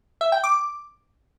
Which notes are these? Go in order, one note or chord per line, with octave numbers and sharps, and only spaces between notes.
E5
G5
D6